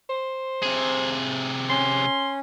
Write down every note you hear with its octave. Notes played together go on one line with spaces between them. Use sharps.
C5
C3 G#4
C#4 C6